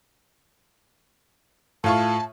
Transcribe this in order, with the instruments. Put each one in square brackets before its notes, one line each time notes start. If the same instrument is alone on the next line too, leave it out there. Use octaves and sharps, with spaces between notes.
[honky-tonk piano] A2 F4 C#6 [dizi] A5